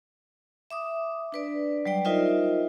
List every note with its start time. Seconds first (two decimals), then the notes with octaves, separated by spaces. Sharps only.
0.70 E5 D6 D#6
1.32 D4 B4 D5
1.86 F#3 G3 D5 G5
2.05 D#4 F4 A#4 C5 D#5 E5